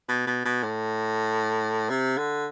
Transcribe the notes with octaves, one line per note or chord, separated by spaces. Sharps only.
B2
B2
B2
A2
C3
D3